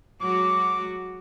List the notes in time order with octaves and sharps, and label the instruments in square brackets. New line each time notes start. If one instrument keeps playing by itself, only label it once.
[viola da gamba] F#3 G#3 F#4 [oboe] D6